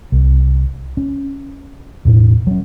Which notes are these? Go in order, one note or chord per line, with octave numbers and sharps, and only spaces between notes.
C2
C#4
E1 A2
F#3 C#4